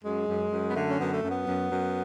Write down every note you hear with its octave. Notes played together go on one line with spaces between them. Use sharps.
F#2 G#3
F#2
F#2
B3
D3 A3
C#4
F#2 B3
A3
F#2
B3
F#2
F#2